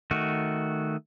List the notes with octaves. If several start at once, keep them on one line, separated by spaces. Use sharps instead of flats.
D#3 A3 F#4